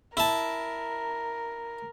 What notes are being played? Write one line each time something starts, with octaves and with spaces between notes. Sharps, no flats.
E4 A#4 A5